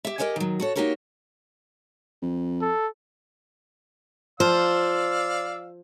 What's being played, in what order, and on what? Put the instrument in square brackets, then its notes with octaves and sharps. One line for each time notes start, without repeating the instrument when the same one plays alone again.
[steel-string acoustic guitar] G4 E5
G4 A#4 C5 D#5 F#5 G#5
D#3 F#3
F#4 A4 C#5
A#3 D#4 F#4 G4 A#4 C#5
[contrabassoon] F2
[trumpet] A4
[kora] F3 [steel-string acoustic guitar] C5 [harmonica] D5 F5 E6